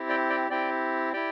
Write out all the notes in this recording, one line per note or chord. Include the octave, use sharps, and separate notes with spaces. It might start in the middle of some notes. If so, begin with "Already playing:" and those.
Already playing: C4 E4 G4
D5 G5
D5 G5
C4 E4 G4 D5 G5
E4 G4 D5 G5